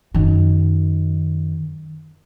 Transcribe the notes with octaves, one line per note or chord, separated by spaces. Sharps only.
F#2 D#3